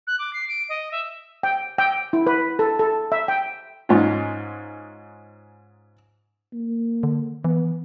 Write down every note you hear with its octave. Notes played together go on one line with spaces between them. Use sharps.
F#6
D6
C7
D7
D#5
E5
G5
G5
E4
B4
A4
A4
E5
G5
G#2 C#4 D#4 F4
A#3
D3
E3 B3